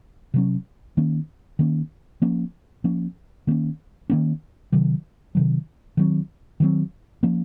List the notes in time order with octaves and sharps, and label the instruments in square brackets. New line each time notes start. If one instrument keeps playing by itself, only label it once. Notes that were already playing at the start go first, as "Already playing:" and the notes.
[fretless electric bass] C3 F#3 C#4
D#3 A#3 C#4
D#3 A#3 C#4
F3 A#3 C#4
F3 A#3 C#4
D#3 A#3 C#4
D#3 A#3 C#4
C3 D#3 F#3
C3 D#3 F#3
D#3 F#3 C4
D#3 F#3 C4
F3 A#3 C#4